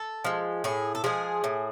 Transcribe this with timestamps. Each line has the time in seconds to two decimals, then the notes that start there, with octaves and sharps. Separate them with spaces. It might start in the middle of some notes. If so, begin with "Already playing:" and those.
Already playing: A4
0.24 F3 G#3
0.64 A2 G#4
0.95 A4
1.04 F3 G#3 G#4
1.44 A2